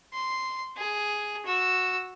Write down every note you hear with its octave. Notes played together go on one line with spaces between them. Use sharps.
C6
G#4
F#4 E6